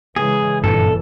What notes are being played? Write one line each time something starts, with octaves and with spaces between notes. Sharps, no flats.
C#3 E3 G#3 G#4
F#1 G2 A#2 E3 A4